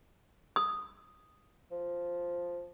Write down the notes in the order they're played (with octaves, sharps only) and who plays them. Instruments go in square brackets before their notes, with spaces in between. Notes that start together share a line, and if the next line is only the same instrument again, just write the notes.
[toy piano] D#6
[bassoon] F3